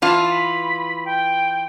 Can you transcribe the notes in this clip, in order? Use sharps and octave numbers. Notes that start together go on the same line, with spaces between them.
E3 F4 A5
B5
G5